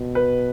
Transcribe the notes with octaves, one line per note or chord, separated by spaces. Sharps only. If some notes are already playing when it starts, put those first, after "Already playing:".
Already playing: B2
B4